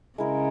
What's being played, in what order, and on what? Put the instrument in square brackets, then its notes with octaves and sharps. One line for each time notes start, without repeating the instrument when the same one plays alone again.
[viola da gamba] C#3 [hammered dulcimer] G#3 E4 A#4